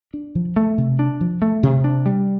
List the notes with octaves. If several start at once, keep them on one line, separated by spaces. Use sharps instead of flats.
D4
F3
A3
C3
D4
F3
A3
C3
D4
G3